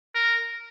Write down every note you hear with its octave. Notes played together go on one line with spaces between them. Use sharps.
A#4